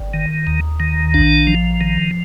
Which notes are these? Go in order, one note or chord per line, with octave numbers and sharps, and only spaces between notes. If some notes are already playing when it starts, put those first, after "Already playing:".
Already playing: G1
D#3
D#2
D#3
A#1 D4
F3
D#3